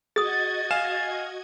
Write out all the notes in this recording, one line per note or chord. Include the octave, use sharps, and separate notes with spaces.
F#4 G#4 D#5 D#6 G#6 A6
F5 G#5 E7